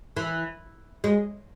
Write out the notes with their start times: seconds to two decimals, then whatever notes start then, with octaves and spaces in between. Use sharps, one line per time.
0.17 E3
1.04 G#3